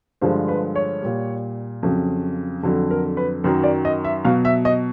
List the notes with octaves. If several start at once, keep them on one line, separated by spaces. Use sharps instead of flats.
G2 D3 F3 G#3 C5
B4
C#5
A#2 G3
F2 C#3 F#3
F2 D3 F#3
A#4
B4
F#2 D#3 F#3
D5
D#5
E5
B2 F#3 F5
E5
D#5